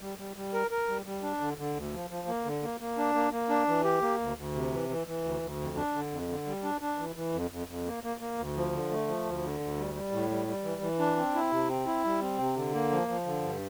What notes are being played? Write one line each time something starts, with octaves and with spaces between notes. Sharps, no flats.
G3
G3
G3
A#4
A#4
G3
G3
D4
D3
D3
D2
F3
F3
A#3
D3
A#3
A#3
D4
A#3
A#3
D4
E3
G4
A#3
D2
D2
C3
E3
E3
E3
D2
D2
F2
D4
D3
F2
D3
G3
D4
D4
E3
E3
F2
F2
F2
A#3
A#3
A#3
D2
F3
D3
A3
F3
D2
D3
D2
G3
G3
A2
G3
G3
E3
E3
D4
C4
E4
C3
C4
E4
G3
C4
C3
D3
A#3
F3
F3
D3
G2